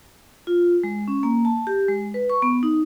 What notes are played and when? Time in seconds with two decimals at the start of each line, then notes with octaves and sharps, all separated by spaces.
0.47 F4
0.84 G#3
1.08 C#4
1.23 A#3
1.45 A5
1.67 G4
1.88 G#3
2.14 B4
2.30 C#6
2.42 B3
2.63 D#4